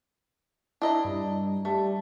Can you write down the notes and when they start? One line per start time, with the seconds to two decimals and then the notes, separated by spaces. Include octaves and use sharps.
0.82 D4 E4 D#5 A#5
1.05 G2
1.65 G3 A3